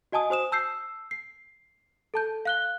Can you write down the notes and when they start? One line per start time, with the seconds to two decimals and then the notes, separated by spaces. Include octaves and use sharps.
0.12 F#4 D#5 G#5 A5 D#6
0.30 F#4 C5 D#6 E7
0.52 A5 E6 G6 C7
1.11 C7
2.14 A4 A5 G6
2.45 F5 F#6 G7